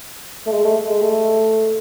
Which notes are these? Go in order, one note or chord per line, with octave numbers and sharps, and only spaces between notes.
A3
G#3
A3
G#3
A3